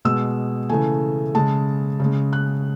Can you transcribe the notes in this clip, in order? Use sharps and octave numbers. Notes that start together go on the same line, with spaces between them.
B2 G#3 E6
C#3 E3 A3 G#5
C#3 G#3 A5
C#3
G#3
F#6